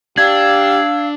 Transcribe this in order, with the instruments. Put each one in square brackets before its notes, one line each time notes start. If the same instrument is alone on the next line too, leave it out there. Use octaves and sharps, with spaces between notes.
[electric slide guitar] D4 [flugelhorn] G4 [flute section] F5 E6 [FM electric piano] G#6